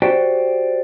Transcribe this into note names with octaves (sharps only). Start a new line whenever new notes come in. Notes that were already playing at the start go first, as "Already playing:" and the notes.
F#4 G4 C5 D5 F#5 G5